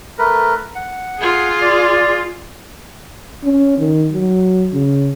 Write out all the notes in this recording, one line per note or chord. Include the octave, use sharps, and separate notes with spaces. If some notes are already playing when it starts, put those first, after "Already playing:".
A3 A#4 B4
F#5
F4 G#4
D5
C#4
D#3
F#3
C#3